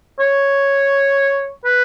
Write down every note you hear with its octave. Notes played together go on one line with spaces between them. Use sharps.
C#5
B4